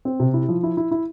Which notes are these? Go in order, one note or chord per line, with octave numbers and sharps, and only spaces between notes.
C4
C3
E4
F3
E4
E4
E4